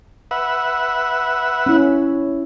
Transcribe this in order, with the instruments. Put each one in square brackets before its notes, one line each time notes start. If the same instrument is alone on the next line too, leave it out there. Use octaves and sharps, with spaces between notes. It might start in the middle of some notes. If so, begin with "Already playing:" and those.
[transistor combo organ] B4 E5 F#5
[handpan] C#4 E4